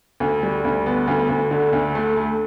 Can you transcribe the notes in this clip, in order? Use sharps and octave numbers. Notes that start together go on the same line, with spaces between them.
D2
G3
D2
B3
D2
D2
D3
D2
A3
A3